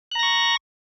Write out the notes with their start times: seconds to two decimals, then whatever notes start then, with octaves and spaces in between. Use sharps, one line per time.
0.12 F#6
0.15 A#5
0.19 A#6
0.23 C#6